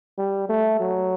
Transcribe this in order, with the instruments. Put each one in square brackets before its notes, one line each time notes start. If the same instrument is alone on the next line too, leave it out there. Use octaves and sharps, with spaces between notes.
[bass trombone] G3
A3
F#3